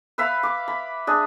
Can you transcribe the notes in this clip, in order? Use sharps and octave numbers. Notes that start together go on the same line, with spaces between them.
B4 E5 F5 B5
D6
B5
D4 G#4